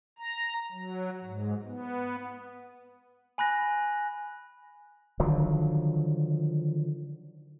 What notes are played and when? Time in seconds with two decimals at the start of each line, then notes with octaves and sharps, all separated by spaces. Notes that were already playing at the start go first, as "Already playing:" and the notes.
0.18 A#5
0.72 F#3
1.24 G#2
1.65 B3
3.38 G#5 B5 F#6 A#6
5.20 D3 D#3 F3 F#3